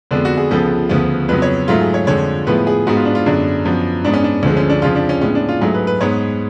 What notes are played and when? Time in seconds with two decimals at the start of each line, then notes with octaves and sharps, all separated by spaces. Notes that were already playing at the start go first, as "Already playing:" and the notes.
0.11 F2 D3 G#3 B3 D4
0.25 F#4
0.37 G#4
0.50 C#2 C#3 F3 G#3 B3 A4
0.89 D2 C#3 F3 B3
1.28 F2 C#3 F#3 B3 B4
1.42 C#5
1.68 G#2 F#3 A3 F4
1.81 G#4
1.94 C#5
2.07 F2 D3 F3 G#3 C#5
2.47 A2 F3 G#3 B3 B4
2.67 G#4
2.87 G#2 G#3 B3 F#4
2.97 F4
3.05 D4
3.15 F4
3.26 F#2 D3 G#3 B3 D4
3.65 F#2 F3 B3
4.05 G#2 G#3 B3 D4
4.14 C#4
4.24 D4
4.43 D2 D3 F3 G#3
4.57 C#4
4.70 D4
4.82 F2 C#3 F3 F4
4.95 D4
5.09 C#4
5.21 A2 G#3 B3 C#4
5.35 D4
5.49 F4
5.61 G#2 F#3 A3 G#4
5.74 B4
5.87 B4
6.01 G#2 G#3 B3 C#5